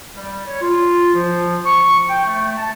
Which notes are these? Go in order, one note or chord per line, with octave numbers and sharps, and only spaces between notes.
G3
C#5
F4
F3
C#6
G5
A3
A5